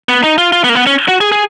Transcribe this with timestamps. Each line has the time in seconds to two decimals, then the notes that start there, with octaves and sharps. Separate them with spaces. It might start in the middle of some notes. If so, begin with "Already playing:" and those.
0.09 B3
0.24 D#4
0.38 F4
0.52 F4
0.64 B3
0.69 A#3
0.75 B3
0.87 C#4
1.08 F#4
1.21 G#4
1.32 G#4